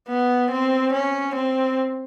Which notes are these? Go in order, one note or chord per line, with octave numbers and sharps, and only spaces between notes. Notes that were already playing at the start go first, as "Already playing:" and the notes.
B3
C4
C#4
C4